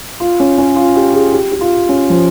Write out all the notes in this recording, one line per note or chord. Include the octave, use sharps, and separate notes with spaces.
F4
C#4
C#4
F4
G4
G#4
G4
G4
F4
C#4
F3